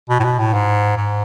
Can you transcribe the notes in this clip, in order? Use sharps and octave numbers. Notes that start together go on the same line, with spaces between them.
B2
A2
B2
A2
G#2
G#2